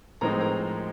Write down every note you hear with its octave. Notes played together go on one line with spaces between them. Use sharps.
A2 F3 G#3 C4 D#4 A#4 A#5
A#4 A#5